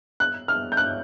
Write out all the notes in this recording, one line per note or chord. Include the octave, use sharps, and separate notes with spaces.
F#6
F6
G6
F#6